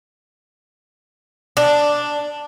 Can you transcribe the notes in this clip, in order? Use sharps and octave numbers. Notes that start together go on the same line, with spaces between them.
D4